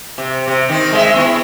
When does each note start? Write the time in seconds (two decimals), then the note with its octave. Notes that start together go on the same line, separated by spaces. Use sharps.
0.18 C3
0.48 C3
0.69 D#3 C4
0.93 G#3 A#3 E5
1.16 B3 E4